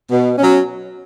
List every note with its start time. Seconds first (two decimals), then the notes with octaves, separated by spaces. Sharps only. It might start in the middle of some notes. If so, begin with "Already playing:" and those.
0.11 B2
0.38 F#3 C#4